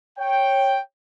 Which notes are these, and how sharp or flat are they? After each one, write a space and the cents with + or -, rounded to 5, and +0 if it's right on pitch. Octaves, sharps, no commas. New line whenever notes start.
C#5 -15 G5 +0